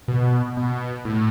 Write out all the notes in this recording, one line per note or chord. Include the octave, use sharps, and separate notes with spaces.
B2
B2
A2